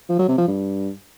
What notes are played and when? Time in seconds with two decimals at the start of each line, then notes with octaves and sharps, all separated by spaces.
0.09 F3
0.19 F#3
0.28 C3
0.38 F3
0.48 G2